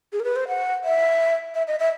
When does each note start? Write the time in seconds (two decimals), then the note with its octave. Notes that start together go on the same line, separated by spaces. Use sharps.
0.13 G#4
0.20 A#4
0.24 B4
0.36 C5
0.48 F#5
0.84 E5
1.54 E5
1.68 D#5
1.79 E5